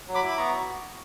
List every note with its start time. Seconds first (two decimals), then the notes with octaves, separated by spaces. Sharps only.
0.08 F#3
0.15 B5 D6
0.23 E4
0.29 D6
0.37 B3 A#5 C#6
0.53 F#4